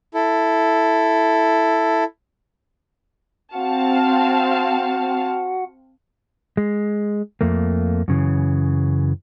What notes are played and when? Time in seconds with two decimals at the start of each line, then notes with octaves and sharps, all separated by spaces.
0.14 E4 A4
3.53 C4 F#4 F5 F#5 A5
6.57 G#3
7.41 F2 A3 A#3
8.08 F#2 C#3 E3